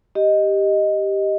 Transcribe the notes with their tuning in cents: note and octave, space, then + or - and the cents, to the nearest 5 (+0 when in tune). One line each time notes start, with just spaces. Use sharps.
G4 +0 D#5 +0